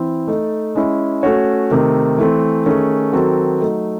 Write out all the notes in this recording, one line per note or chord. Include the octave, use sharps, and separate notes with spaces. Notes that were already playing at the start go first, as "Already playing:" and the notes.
Already playing: E3 C4 E4
A3 D#4 A4
G#3 C#4 E4
A3 C#4 F#4 C#5
C3 D#3 A3
E3 A3 C4
D#3 A3 C#4 G#4
D#3 F#3 C4 F#4 A4
F#3 A3 D#4